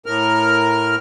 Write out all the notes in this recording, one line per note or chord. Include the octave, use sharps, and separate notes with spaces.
A2 A#4 F6